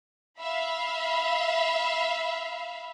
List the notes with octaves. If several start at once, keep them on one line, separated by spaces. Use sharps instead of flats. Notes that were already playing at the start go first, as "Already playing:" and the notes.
E5 F5 B5